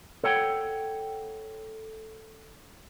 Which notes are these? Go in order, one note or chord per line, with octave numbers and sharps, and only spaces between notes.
A4 C#5 F#5 G5